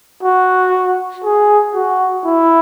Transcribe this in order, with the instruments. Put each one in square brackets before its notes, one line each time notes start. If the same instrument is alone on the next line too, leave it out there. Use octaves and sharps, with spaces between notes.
[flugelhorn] F#4
G#4
F#4
E4